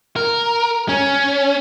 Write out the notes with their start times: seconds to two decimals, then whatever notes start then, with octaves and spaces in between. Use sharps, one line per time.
0.16 A#4
0.89 C#4